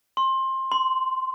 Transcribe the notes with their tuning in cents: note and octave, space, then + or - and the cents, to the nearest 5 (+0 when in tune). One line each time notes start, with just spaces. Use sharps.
C6 +20
C6 -10